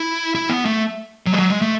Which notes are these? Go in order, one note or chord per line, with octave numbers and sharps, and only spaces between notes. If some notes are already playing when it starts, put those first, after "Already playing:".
Already playing: E4
E4
B3
A3
F#3
G#3
F#3
G#3
A3